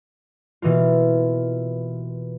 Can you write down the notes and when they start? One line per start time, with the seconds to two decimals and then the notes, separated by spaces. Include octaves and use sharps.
0.62 B2 E3 A#3 F4